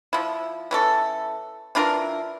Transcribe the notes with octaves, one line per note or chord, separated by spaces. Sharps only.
F3 E4
E3 C#4 A4
E3 D4 F4 A#4